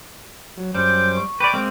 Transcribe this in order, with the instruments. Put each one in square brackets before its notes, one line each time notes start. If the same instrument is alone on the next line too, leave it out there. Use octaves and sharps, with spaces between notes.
[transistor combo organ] F#3
[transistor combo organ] F#2 C5 D6 [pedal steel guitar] G3 [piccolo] G6
[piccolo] C#6
[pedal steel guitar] B4 D5 [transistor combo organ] G5 D6
[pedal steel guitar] G#3 A#3 C4